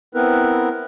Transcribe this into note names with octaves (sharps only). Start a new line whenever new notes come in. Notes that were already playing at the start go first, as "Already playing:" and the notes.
B3 C4 E4 A#4 B4